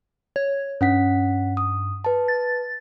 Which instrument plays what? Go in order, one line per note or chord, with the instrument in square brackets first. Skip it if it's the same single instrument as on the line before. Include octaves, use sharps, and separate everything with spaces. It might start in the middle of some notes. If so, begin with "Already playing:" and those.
[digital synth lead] C#5
[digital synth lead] G2 [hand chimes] C#4 F#5 B6
[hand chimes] D#6
B4 A5
[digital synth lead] A6